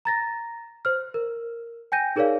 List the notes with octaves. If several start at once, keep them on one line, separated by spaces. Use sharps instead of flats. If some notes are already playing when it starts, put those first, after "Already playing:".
A#5 A6 A#6
C5 F6
A#4
G5 G#5 G6 A#6 D#7
D#4 G#4 A#4 C#5 D5 F5